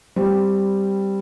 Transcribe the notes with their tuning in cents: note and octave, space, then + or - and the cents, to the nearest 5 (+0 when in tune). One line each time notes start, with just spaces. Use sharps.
G3 +0 C4 +0